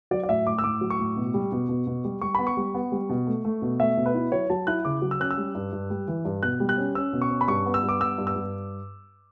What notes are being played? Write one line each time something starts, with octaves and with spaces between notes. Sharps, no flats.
F#3 D5
D5
A2 E5
A2 D6
E6
A2 D6
F#3
C#6
A2
B2
G3
B2
B2
B2
G3
G3 C#6
B3 B5
C#6
G3
B3
G3
B2
A3
A3
B2
A3 E5
B2
B4
E4
F#3 C#5
F#3 A5
E4 F#6
C#3 D6
F#3
E6
C#4 F#6
E6
G3
G2
G2
G3
E3
G2
B2 F#6
G3
F#6
C#4
C#4 E6
B2
C#6
C#4
B5
G2 C#6
B3
E6
G2
D6
B3 E6
G2
E6
G2